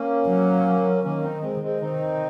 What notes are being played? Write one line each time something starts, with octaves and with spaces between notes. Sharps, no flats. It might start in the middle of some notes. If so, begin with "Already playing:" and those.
Already playing: A#3 C#4
F#3
D#3 A#3 C#4
C4 D#4
G#3 C4
G#3 C4
D#3 C4 D#4